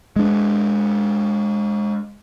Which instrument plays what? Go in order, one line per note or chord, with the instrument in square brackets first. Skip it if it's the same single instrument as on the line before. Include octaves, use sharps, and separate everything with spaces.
[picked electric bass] G#3 D4